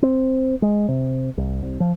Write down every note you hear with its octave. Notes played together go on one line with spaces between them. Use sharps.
C4
G#3
C3
C2
C2
F3